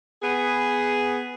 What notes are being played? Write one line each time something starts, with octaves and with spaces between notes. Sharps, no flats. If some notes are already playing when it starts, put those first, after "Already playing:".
B3 G#4